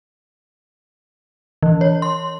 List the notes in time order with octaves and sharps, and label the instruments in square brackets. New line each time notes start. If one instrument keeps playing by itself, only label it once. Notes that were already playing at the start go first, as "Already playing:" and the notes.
[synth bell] E3
C#5
C6